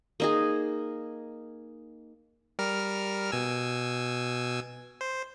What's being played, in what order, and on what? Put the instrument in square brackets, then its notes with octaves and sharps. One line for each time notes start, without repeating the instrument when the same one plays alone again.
[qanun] A#3 D#4 G#4
[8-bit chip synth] G3 A#4 F6
B2 G#5 E6
C5